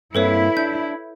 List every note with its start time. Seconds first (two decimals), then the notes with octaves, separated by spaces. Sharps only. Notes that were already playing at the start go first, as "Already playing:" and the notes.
0.15 G2 A#3 C4 E4 A4 B4 C#5
0.57 D4 G6